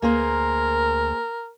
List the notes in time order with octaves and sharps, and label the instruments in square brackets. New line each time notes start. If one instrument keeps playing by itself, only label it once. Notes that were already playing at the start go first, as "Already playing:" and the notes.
[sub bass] D2 [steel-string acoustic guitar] A#3 G#4 C5 [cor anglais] A#4